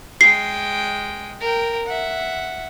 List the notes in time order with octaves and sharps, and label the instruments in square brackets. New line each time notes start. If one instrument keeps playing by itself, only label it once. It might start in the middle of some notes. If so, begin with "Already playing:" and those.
[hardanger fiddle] G#3 G5 [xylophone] C7
[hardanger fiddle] A#4 G5
E5 F#5